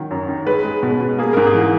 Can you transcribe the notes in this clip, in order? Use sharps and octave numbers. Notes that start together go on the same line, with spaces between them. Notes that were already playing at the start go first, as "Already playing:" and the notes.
Already playing: D#3 F#3
F#2
D#3
G#3 B4
G#3
B2
B2
A#3 G#4
G#2 A#4
G#4
E3